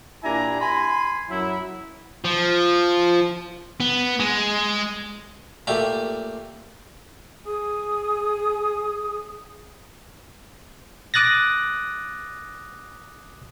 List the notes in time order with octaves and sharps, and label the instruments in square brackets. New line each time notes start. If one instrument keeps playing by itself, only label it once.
[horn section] A#2 D4 E4 G4 G#5 A#5
G#5 B5 C6
F#2 F#3 E4
[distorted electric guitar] F3
B3
G#3
[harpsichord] A#2 A3 G4
[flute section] G#4 G#5 D#6
[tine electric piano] D6 D#6 F#6 A6 A#6